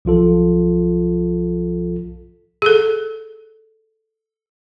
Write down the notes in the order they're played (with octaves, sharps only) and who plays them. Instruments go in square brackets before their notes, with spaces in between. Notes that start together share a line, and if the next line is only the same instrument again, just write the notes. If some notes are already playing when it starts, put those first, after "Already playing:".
[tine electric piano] B1 F3 F4 A4
[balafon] G#4 A4